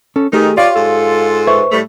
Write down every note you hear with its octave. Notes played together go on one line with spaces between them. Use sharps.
C#4 A4
D#3 A3 D#4 G4 G#4
F4 G4 C#5 D5 F5
G#2 F4 A4
B4 C5 E5 C#6
A2 G3 A3